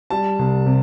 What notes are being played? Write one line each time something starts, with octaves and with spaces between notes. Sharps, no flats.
G3 A5
C2
C3